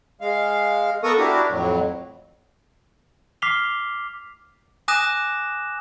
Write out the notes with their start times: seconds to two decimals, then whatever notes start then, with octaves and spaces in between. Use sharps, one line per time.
0.21 G#3 F5
1.03 B3 A4 A#4 C#6 D#6
1.19 D4 E4 F#4 G4 A#4
1.49 F2 A2 F#3
3.42 D6 F6 B6 C7 F7 G7
4.88 G#5 D6 D#6 F#6 A#6 E7